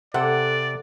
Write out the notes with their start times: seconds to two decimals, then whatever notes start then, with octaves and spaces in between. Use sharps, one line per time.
0.14 C3 A4 D5 F#5